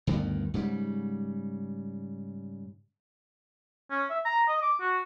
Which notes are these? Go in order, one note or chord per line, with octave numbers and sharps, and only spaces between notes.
D2 G2 B2 D#3
G#2 C#3 G3
C#4
E5
A#5
D#5
D6
F#4